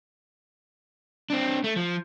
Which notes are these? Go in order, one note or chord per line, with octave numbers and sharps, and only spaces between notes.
C4 D4
A3
F3